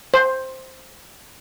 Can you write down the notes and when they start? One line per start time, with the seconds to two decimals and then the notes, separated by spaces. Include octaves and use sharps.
0.14 C5